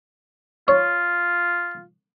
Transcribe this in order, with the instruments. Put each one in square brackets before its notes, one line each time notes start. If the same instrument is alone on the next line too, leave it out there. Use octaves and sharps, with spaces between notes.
[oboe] F4 [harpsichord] C#5